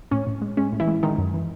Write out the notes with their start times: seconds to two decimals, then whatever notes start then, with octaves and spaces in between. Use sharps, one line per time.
0.11 A2 C#4
0.27 A2
0.41 G#3
0.57 G#3 C#4
0.72 A2
0.80 E3 E4
0.88 G#3
1.03 D#3 G#3 D#4
1.18 F#2
1.34 E3